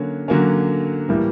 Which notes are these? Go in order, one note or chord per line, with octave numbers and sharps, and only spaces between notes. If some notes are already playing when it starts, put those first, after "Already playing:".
Already playing: D3 F#3 A#3 C#4
D3 F#3 A#3 C#4
A2 E3 G3 A#3